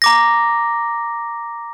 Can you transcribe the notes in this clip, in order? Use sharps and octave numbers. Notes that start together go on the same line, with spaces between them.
A#5 D6 A#6